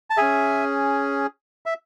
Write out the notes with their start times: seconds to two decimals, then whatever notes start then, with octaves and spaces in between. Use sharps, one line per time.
0.10 A5
0.17 C#4 G#4 E5 G#5
1.66 E5